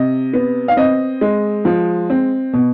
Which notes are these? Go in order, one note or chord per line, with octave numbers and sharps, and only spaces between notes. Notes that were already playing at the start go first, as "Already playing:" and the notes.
Already playing: C3 D#5
B3
F5
C4 D#5
G#3
F3
C4
B2